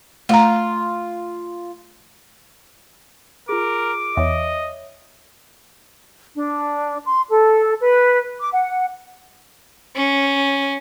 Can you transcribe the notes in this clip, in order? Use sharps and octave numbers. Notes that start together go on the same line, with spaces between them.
A3 F4 A#5
F4 G#4 A#4 D6
E2 C#5 D#5 E5
D4
C6
A4
B4
D6
F#5
C#4